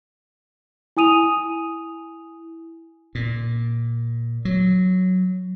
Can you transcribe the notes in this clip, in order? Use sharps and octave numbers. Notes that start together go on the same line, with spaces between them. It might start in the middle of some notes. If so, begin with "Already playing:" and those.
E4 G#5 D#6 D#7 F7
A#2
F#3